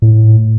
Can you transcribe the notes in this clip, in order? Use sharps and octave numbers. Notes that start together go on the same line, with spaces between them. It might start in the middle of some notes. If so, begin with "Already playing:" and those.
A2